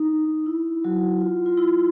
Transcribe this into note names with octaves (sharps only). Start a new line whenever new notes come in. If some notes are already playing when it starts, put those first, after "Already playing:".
Already playing: D#4
E4
F#3 F#4
F4
F4
E4